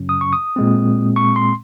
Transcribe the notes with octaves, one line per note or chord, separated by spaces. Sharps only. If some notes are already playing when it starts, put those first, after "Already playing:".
Already playing: F#2 C#3 F#3 C#4
D#6
C#6
D#6
A#2 G#3 C4
C#6
C6